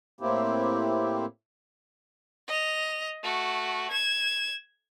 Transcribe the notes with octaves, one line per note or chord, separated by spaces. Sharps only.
A2 A#3 C4 E4 G4
D#5 F7
A3 F#4
G#6 E7